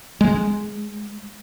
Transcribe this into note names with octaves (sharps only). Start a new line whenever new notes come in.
G#3